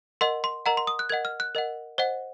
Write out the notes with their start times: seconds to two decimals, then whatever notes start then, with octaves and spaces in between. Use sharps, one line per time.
0.21 A#4 D#5 F#5 C6
0.44 C6
0.66 A#4 D#5 F#5 A#5
0.77 C6
0.87 D#6
0.99 F#6
1.09 A#4 D#5 F#5 G#6
1.25 F6
1.40 F#6
1.55 A#4 D#5 F#5
1.98 C5 D#5 F#5